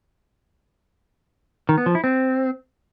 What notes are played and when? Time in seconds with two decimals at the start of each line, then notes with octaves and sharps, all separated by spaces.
1.69 D#3
1.78 B3
1.86 F3
1.95 E4
2.04 C4